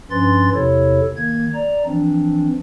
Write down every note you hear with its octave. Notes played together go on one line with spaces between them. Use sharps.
G2 F3 C#4 B4 C6 A6
E2 C3 E4 A4 C#5
D#3 A#3 G#6
D5 A#5
E3 F3 C4 D4